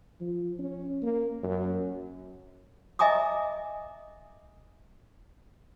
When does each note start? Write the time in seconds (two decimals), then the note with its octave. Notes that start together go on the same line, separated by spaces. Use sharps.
0.21 F3
0.59 C#4
1.03 A#3
1.43 F#2
2.99 D#5 E5 G#5 A#5 D6 D#6